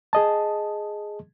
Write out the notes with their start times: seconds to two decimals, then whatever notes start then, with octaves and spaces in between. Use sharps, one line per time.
0.13 G#4 D#5 A5